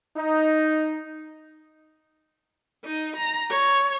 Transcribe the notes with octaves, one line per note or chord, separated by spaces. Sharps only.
D#4
D#4
A#5
C#5